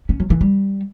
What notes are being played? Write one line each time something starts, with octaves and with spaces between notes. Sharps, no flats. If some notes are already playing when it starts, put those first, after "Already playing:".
C#4
F#3
E3
G3